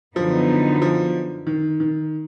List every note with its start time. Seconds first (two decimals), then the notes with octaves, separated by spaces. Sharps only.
0.16 F#2 D3 F3 F#3 B3 D#4
0.82 F3
1.47 D#3
1.80 D#3